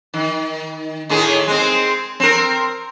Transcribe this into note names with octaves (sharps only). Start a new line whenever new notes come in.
D#3
A2 D#3 G#4
G#3 C4
C4 A#4